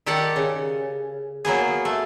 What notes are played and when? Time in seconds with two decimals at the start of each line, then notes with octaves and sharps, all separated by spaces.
0.06 D#3 G4 A4 D5 F#5 A5
0.36 C#3
1.45 F#3 A#3 B3 G#4
1.85 A3